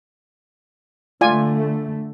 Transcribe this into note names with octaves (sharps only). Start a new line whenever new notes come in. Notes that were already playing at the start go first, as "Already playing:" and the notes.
D3 A3 F4 D5 G#5